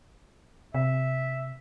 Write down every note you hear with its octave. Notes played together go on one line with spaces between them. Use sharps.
C3 E5